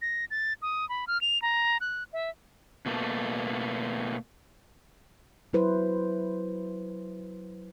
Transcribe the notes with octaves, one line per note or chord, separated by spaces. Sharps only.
A#6
A6
D#6
B5
F6
F7
A#5
F#6
E5
B2 A3 A#3
F#3 E4 B4 C5